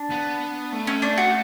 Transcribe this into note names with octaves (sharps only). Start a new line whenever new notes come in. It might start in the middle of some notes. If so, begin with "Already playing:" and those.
Already playing: D4
B3
A3
C#4
D4
F#4